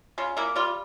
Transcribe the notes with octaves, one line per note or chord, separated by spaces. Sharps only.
C#3 F4
A#3 E4
G3 F4